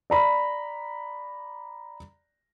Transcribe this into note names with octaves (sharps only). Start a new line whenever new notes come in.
D5 A#5 B5